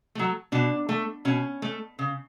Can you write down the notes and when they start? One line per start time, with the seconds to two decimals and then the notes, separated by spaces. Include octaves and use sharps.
0.15 F#3 A3
0.52 B2 D4
0.89 A3
1.25 B2 C#4
1.62 A3
1.99 C#3